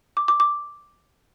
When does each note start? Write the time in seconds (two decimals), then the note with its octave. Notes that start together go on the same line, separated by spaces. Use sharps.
0.17 D6
0.28 D6
0.40 D6